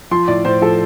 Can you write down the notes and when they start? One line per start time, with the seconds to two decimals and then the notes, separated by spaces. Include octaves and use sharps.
0.11 F3 C6
0.28 A2 D5
0.45 A2 C5
0.61 F3 A4